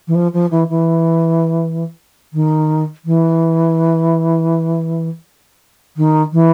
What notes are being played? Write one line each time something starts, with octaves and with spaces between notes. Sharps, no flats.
E3
F3
F3
E3
E3
D#3
E3
D#3
E3